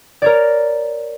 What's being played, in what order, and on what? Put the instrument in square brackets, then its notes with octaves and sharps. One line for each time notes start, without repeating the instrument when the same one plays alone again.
[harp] A#4 C#5 D5